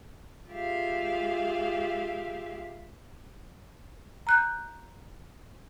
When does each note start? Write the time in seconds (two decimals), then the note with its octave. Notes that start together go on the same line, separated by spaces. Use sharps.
0.49 G#3 F4 G4 G#4 E5 F5
4.27 A#5 F#6 G6